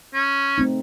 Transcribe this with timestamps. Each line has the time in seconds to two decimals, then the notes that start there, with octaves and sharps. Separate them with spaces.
0.14 C#4
0.58 A3 C4 D#4